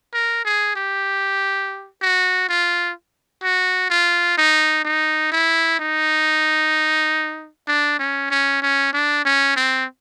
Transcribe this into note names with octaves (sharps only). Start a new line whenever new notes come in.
A#4
G#4
G4
F#4
F4
F#4
F4
D#4
D#4
E4
D#4
D4
C#4
C#4
C#4
D4
C#4
C4